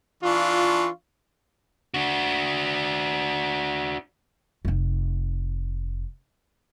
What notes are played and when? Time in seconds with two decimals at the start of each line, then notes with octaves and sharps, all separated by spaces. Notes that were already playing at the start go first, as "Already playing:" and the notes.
0.23 E3 D4 F4 C#6
1.94 D4 F#4
4.65 F1 D#4